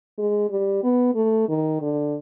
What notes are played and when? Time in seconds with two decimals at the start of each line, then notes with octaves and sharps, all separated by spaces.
0.18 G#3
0.51 G3
0.83 B3
1.15 A3
1.49 D#3
1.82 D3